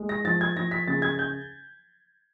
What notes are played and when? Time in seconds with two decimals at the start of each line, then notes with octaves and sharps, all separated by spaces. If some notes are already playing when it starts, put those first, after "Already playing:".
Already playing: G#3
0.09 A#6
0.25 F3 A6
0.41 G#6
0.56 F3 A#6
0.71 B6
0.88 C#3 A6
1.02 G#6
1.19 G6